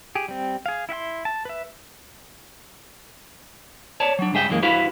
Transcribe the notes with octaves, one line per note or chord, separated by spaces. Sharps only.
G4 G#4
G3 C4
G#4 F5
E4 E5 F#5 C6
A5
B4 E5
C#5 D5 A5
F#3 D4
C#2 G2 G#4 E5 G5
F#2 E3 G#3 A#3
G2 E4 F#4 B4 E5 F5